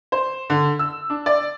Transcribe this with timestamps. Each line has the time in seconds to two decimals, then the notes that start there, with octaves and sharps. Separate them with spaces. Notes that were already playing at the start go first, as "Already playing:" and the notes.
0.12 C5
0.50 D3
0.79 E6
1.10 D4
1.26 D5